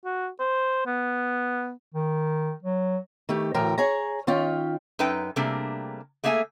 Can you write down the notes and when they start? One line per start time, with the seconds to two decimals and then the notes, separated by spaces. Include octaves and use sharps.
0.05 F#4
0.40 C5
0.86 B3
1.95 D#3
2.63 F#3
3.29 D#3 A3 G4
3.54 D2 A2 E3 A#4 G5 A#5
3.78 G#4 C#5 G#5 A#5
4.27 D#3 C#4 F4 G5
4.99 F#2 D#4 B4 G5
5.36 C3 G3 A3 A#3 D4 G#4
6.24 A3 A#3 G#4 E5 F5 G#5